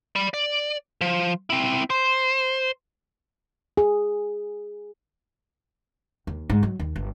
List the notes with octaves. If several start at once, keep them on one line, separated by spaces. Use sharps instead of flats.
D5 B5
D5
F3
C4 E4
C5
G#4
D#2
G#2
F#3
D#2
G1